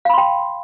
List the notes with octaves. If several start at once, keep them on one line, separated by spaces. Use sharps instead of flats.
F5 G5 B5 C6